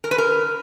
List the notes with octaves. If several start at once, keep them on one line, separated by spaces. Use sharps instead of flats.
A#4
B4
A#4